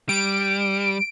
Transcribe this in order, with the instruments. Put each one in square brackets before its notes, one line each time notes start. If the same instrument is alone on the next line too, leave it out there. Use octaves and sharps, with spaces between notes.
[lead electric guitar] G3 [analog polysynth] D7